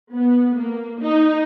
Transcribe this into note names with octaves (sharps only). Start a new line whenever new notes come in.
B3
A#3
D#4